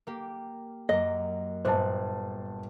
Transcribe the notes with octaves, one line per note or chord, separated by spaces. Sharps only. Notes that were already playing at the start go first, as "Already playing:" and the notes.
A#3 G4
F#2 A#3 D#5
G1 A#2 C5 A5 F#6